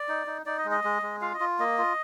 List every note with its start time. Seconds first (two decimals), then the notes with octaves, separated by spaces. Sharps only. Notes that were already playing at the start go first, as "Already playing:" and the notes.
Already playing: D5
0.09 D#4
0.27 D#4
0.46 D#4 D5
0.58 D#5
0.65 G#3
0.71 D#5
0.84 G#3
1.02 G#3
1.21 F4 F5
1.34 D#5
1.40 F4
1.59 A#3 D#5
1.78 F4